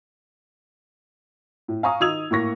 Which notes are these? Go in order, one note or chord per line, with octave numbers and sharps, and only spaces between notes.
A2
F5 G#5 A#5 C#6 D#6
D#3 D#4 D#6 E6 G#6 F7
A2 A#3 C#6 A#6